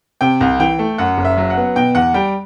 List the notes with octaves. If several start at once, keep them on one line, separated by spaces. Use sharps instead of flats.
C3 G5
C2
E3 G5
A3
F#2 F#5
F#1
E5
F#3
F#5
B3
B2 G5
E2 F#5
G3 G5